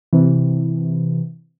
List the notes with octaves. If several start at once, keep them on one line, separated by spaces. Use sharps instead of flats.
C3 E3